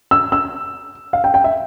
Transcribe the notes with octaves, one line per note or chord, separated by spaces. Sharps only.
E6
E6
F5
G5
G5
E5